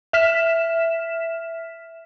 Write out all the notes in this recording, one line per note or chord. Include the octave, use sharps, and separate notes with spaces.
E5 F6 B6 E7